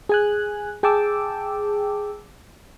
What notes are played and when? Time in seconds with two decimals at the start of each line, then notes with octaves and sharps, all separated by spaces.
0.09 G#4 G#5 F#6
0.83 G#4 G5 A5 D6 E6